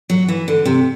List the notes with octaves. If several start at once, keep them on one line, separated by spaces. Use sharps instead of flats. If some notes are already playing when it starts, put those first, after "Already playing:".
F#3
E3
D3
C3